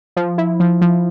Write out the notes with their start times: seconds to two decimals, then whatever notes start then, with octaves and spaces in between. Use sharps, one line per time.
0.17 F3
0.38 E4
0.60 F3
0.81 F3